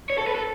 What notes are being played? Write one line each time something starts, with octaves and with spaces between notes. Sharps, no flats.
C#5
A4
B4
A4